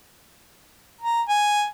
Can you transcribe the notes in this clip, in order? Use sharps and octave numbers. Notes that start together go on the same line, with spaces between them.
A#5
G#5